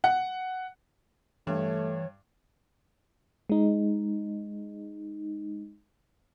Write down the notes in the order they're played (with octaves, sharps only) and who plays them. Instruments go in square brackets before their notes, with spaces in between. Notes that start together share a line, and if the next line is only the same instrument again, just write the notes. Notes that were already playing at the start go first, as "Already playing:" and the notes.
[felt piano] F#5
[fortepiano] G2 [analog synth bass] E3 [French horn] A3 [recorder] C#5
[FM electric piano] G#3 D#4